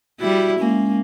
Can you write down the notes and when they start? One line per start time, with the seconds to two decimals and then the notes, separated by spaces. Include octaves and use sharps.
0.20 G3 E4 F#4
0.59 G#3 A#3 C#4